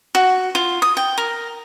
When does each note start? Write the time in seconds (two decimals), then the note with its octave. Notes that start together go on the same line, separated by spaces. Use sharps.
0.15 F#4
0.55 F4
0.82 D#6
0.97 G5
1.18 A#4